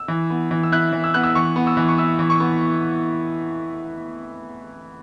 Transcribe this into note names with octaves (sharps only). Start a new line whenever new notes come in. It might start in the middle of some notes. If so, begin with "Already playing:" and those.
Already playing: E6
E3
B3
E3
E6
E4 F#6
E3
E6
B3 F#6
E6
E3 C#6
B3
E6
E3
C#6
E4 E6
E3
C#6
B3